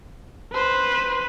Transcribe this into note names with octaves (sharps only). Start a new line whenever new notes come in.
B4 C5